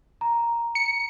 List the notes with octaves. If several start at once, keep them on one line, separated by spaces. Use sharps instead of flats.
A#5
C#7